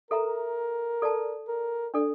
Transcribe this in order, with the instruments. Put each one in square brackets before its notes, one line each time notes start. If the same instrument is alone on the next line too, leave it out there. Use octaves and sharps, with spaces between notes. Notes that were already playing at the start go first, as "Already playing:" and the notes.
[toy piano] A4 E5 A#5 [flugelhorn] A#4
[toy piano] A4 D5 A5
[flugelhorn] A#4
[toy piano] D4 A4 D5